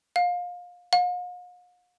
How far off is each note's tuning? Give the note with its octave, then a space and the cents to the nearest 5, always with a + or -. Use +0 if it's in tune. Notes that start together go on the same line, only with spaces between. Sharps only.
F5 +25
F5 +45